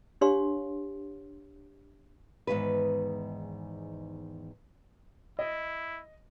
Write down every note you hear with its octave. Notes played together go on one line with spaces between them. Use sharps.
D4 G4 C#5 F5 C6
E2 G#2 C3 D#3 B4
E4 D#5